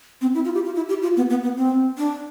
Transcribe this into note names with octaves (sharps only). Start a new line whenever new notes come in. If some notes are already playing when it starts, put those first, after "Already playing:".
C4
E4
F4
G4
F4
E4
G4
F4
B3
B3
B3
C4
D4